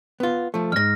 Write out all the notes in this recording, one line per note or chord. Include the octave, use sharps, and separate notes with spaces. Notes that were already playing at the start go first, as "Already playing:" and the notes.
B3 F4
F3 A3
F2 G#2 F6 A#6